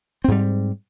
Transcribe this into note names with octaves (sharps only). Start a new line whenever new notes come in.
G#2 G3 C4